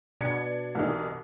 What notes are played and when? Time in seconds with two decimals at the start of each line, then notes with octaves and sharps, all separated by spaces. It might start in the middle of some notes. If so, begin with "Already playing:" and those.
0.21 B2 D4 G#6 C#7
0.75 C2 E3 D#4